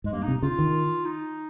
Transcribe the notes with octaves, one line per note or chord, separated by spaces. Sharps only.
G#2 G#3
G2 A#3
C3 D#4
C#3 F4
D#3
D#4